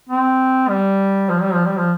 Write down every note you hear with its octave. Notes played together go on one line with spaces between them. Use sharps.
C4
G3
F3
G3
F3
G3
F3